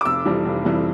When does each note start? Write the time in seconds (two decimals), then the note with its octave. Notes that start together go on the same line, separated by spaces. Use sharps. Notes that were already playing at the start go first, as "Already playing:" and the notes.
0.01 D6
0.05 F1 E6
0.25 F2 E3 G3
0.45 F1
0.65 F2 E3 G3